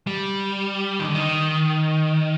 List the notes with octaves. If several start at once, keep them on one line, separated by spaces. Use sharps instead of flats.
G3
D#3
D3
D#3